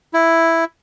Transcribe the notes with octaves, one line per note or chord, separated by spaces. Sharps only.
E4